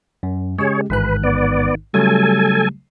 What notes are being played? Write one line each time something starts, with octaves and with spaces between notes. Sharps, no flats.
F#2
C#3 G#3 G4 G#4 C#5
A1 G#2 D#3 B4 F#6
B3 D5
C#3 F#3 G3 A3 A4 G#5